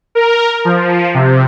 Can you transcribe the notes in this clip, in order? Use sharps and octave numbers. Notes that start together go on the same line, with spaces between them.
A#4
F3
C3